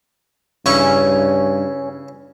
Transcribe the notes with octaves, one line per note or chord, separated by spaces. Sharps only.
G2 C#3 C#4 E4 C#6